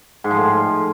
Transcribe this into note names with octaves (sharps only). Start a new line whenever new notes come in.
G#2
F3
A2